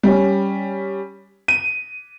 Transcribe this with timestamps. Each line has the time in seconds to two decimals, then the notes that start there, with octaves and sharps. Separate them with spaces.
0.03 G3 C#4
1.48 D#7